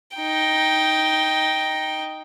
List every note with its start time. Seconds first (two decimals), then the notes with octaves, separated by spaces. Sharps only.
0.17 D#4 G5